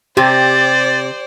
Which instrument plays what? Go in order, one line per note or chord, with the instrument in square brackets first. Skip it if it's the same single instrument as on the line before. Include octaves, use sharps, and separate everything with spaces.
[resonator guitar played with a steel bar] C3 [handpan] G4 [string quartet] C5 D5 [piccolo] A6